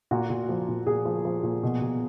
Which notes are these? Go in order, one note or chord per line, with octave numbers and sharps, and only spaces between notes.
A#2 F#4
A#2
F3
A#2
A#2 G#4
F3
F3
A#2
B2
B2